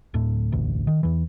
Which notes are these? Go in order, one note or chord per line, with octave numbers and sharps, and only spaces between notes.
D1 A2
E1 A1 D2
D#3
E2 E3